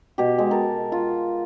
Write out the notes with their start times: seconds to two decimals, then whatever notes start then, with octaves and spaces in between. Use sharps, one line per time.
0.18 B2 G4
0.38 G#3
0.51 A#4 A5
0.92 F4